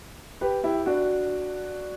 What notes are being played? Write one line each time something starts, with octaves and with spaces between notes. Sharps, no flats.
G4 B4
E4 G4
D4 F#4